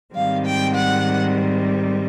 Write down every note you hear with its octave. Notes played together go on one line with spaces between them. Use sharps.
G#2 D#3 G3 C4 F5
G5
F#5